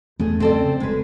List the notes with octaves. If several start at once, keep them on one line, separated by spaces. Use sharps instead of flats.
E2 A3 G#4
C#3 F3 C4 A4 D5
E1 G#3 B4